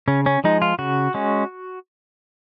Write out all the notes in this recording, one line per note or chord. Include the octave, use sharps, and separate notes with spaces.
C#3 C#4
C#4
F3 G#3 D#4
F4
C#3 F#4
G#3 C#4